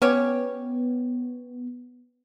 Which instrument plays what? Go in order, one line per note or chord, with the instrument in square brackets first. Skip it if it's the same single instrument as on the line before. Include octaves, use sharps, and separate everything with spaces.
[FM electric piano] B3 [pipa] C#4 G4 C#5